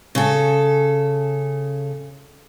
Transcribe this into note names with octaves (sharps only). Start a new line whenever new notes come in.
C#3 A4